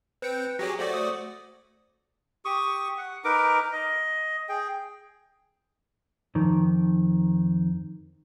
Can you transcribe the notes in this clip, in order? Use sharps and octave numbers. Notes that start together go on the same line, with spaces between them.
C4 B4 G5 C#7
F#3 G4 G#4 C#5 A#6
A3 F#4 C5 D5
D#6
G4 C#6 D#6
F#5
D#4 A#4 B4 D6
D#5
G#4 G5
F2 D#3